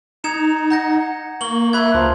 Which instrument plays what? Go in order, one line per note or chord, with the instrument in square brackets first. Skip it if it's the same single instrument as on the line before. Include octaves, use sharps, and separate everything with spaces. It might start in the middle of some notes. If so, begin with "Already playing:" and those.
[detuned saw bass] D#4 [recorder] A#5 [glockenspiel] G#6 C#7 E7
[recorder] F#5 [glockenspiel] A#5 G6 A#6
[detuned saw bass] A#3 [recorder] C#6 [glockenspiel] F#7 G7
[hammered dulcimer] E5 [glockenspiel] B5 G#6 [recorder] F#6
[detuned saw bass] C#2 [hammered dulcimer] F3 F4 [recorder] A#5